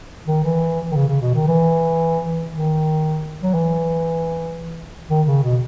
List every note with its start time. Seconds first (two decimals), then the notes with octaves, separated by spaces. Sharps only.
0.27 D#3
0.44 E3
0.91 D#3
0.96 C#3
1.08 C#3
1.21 B2
1.34 D#3
1.48 E3
2.50 D#3
3.43 F#3
3.54 E3
5.09 D#3
5.27 C#3
5.43 B2